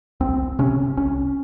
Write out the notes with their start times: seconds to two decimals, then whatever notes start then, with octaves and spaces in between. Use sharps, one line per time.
0.20 C2 C4
0.59 C3 C#4
0.97 C2 C#4